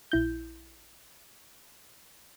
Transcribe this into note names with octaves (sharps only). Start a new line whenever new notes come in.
A#1 E4 G6